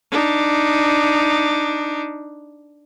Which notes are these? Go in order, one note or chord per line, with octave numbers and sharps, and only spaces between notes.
D4 D#4